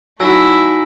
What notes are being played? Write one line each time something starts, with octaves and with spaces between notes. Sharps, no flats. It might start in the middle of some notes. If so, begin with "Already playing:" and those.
F#3 A3 D#4 E4 G#5 E6 A#6